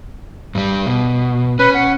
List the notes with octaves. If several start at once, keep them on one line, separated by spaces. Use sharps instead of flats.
G2 G3
B2
C#4 B4
F#5